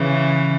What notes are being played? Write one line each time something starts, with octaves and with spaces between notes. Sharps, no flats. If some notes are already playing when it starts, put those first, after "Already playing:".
Already playing: C#3 E3